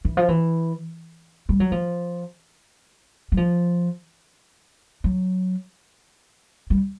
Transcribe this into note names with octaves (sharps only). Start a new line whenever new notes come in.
E3
F3
E3
G3
F#3
F3
F#3
F3
F#3
G3